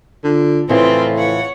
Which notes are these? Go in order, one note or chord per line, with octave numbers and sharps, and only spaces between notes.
D3 F4
A2 C#3 E3 F3 C4 F4 B4 C5
C#5 F5 F#5